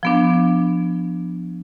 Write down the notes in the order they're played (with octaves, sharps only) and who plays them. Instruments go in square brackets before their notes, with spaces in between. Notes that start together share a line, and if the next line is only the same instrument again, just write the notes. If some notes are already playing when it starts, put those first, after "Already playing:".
[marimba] F3 B3 D4